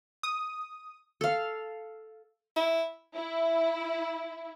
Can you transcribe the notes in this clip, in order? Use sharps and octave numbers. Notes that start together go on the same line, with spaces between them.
D#6
A4 F5
E4
E4